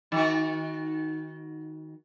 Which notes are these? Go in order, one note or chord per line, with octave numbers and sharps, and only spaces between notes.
D#3 F#4